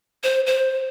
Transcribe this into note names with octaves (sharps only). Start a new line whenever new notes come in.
C5
C5